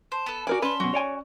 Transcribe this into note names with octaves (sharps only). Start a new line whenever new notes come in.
C5 A5
B3 A4
F#4 A#4 D5 G#5
C#4 B4 A5 B5 C6
F#2 B2 F#4
C#5 D5 G#5